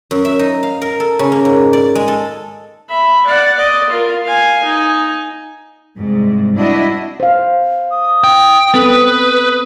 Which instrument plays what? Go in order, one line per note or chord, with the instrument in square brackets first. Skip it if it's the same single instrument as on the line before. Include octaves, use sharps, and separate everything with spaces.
[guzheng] F#2
E5
D#4
F5
A#4
A4
C#3
A#3
G#2
D5
G#3
A4
[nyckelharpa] E5 B5
D5 F#5
D5 D#5
F4 A#4
F5 G#5
D#4 G#5
[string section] C2 G#2
D4 E4 F#4 D#5
[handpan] C5 F5
[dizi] D#6
[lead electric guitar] G5
[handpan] B3 C4 A4 [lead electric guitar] B4